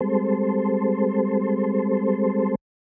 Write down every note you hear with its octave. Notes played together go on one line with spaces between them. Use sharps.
G3 G#3 C4 A4 C5